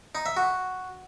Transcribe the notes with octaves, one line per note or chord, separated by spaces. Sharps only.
D#4
E5
F#4